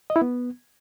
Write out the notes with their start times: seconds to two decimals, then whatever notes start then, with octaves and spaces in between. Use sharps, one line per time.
0.10 D#5
0.16 E4
0.22 B3